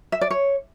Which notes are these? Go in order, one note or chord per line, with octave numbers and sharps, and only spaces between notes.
E5
D5
C#5